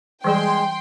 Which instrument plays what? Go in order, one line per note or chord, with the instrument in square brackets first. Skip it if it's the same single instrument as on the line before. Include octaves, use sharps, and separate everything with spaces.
[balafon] E3 G3 G#4 [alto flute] G#3 [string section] G5 C6